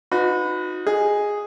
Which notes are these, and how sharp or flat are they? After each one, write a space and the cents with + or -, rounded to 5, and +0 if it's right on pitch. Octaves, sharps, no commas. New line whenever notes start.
D#4 +0 F#4 -35 B4 +15
G#4 -5 D#5 +0